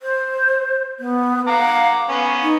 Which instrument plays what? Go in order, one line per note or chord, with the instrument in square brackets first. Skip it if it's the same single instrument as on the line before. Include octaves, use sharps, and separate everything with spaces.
[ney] C5
B3
[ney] F5 [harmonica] F#5 A#5 D6
[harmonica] B3 C#4 [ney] F5
[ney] D#4